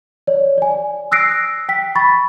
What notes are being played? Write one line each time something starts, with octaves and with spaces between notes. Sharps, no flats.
C#5 D5
D5 G#5
D#6 E6 F#6 A#6 C7 D7
G5 B6
B5 C#6 A6